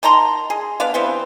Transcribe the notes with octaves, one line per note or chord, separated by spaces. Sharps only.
D#3 A5 A#5 C6
G#4
B3 D4 D5 F5
E3 G3 B3 C4